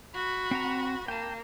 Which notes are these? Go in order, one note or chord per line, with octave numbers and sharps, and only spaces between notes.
F#4 B5
C4 F#5 A#5
A#3 G5 A5